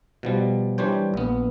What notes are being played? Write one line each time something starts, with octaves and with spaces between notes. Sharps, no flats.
B2 F3 G3
E3 G3 D4 C5 C#5 G5
A#1 B3